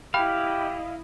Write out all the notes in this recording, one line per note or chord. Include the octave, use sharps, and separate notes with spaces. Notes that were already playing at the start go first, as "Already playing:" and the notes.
E4 G4 D#5 F5 G5 B5